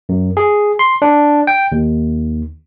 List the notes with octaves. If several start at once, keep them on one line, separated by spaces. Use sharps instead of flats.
F#2
G#4
C6
D4
G5
D#2